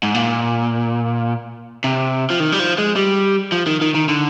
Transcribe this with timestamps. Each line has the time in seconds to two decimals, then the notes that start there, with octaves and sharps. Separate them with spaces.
0.03 G#2
0.14 A#2
1.84 C3
2.30 F3
2.40 D#3
2.52 G3
2.59 F3
2.78 G#3
2.96 G3
3.52 F3
3.67 D#3
3.81 D#3
3.95 D#3
4.09 D3